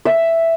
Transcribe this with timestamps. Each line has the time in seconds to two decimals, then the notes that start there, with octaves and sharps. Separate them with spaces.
0.05 E5